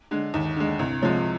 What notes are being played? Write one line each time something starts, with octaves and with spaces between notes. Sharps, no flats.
D3 G#3
D#2
D3 G#3
C2
C3 F3 G#3